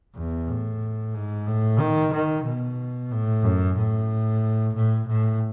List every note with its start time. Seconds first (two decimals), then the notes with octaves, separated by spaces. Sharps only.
0.16 E2
0.48 A2
1.14 G#2
1.46 A2
1.79 D#3
2.13 D#3
2.45 B2
3.11 A2
3.43 F#2
3.77 A2
4.75 A2
5.08 A2